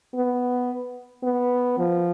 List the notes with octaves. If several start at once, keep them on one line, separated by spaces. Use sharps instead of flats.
B3
B3
F3